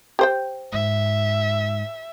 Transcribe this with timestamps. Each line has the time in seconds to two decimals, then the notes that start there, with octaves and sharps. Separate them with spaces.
0.19 G4 C5 G5
0.72 G#2 E5